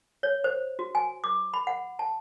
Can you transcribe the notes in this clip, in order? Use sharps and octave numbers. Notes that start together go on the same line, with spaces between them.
C#5
C5
F#4
G#5
D6
B5
F#5
A5